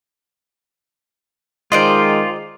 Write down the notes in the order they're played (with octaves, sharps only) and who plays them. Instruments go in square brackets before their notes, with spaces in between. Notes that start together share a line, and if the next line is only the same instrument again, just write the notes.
[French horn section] D#3 G#3 [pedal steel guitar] F4 [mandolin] C5 D5 D#5